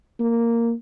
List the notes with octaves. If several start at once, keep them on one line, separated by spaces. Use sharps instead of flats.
A#3